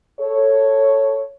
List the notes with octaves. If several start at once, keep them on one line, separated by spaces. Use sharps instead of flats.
A4 C#5